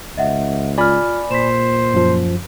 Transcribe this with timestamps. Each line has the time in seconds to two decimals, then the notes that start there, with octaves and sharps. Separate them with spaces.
0.17 C#2 D#5 E5 F#5
0.78 F4 D5 G#5 B5 F6
1.31 A#2 C5 B6 E7
1.94 F#2 F3